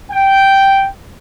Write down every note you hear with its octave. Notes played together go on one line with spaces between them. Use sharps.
G5